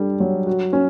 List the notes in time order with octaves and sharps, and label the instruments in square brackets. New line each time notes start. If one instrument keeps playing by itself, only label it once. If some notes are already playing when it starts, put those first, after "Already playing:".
Already playing: [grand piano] G3 D4 A4
F#3
F#4
C#4